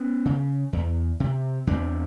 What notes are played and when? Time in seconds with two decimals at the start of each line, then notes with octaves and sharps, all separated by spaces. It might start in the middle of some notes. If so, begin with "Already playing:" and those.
Already playing: B3 C#4
0.25 C#3
0.73 E2
1.20 C3
1.67 E2 C4 D4